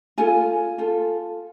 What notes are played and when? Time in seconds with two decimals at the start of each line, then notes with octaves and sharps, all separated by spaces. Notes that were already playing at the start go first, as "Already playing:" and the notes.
0.18 F4 A4 G#5
0.78 F4 A4